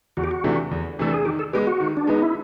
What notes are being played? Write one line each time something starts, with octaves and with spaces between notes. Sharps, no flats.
E2 F#4
G4
F#4
C3 E3 A3 D4
E2
C3 E3 A3 D4 A4
G#4
D#3 G4
A4
G#3 B3 G4
F#4
D#3
D4
G#3 B3 D#4
E4